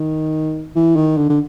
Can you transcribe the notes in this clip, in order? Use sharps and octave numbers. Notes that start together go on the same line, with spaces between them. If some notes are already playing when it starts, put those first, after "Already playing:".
Already playing: D#3
E3
D#3
D3
D3